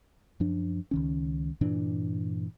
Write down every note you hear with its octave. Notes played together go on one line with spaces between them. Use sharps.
F#2 F3 D4
C#2 D#3 C#4
G2 A#2 E3 D4